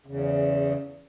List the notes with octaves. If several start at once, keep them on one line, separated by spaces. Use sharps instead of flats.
E2 C#3